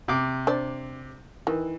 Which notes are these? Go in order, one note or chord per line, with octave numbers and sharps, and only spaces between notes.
C3 D6
D4 C5 D5
D#3 E3